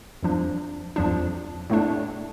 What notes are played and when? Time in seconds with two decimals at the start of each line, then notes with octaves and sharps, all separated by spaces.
0.23 F2 F3 D4
0.96 F2 F3 D4
1.70 A2 A3 D4